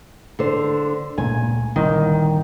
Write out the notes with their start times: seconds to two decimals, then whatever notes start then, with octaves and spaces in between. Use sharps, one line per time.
0.39 D3 C5
1.18 C#2 A#2 A3 G#5
1.76 G1 C2 A#2 D#3